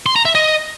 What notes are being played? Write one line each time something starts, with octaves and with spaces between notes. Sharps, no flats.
C6
A#5
E5
D#5